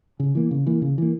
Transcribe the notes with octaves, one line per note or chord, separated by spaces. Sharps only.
C#3
E3 A#3
C#3
E3 A#3
C#3
E3 A#3